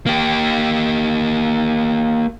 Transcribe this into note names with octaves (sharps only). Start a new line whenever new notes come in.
A#3 G4